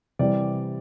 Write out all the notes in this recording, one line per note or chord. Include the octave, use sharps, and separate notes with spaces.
C3 E3 G3 D5